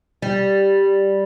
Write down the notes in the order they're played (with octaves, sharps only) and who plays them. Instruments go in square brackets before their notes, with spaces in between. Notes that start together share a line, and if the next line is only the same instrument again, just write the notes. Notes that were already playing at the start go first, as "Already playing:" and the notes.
[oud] G3